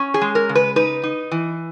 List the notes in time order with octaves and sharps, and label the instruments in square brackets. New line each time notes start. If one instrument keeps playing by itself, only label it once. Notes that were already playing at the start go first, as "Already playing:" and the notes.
Already playing: [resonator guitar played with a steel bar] C#4
G#4
G#3
A#4
C#3
B4
D#4 B4
D#4
E3